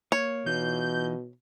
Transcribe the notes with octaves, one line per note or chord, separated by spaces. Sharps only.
A#3 C#5
B2 E3 D#4 F4 G6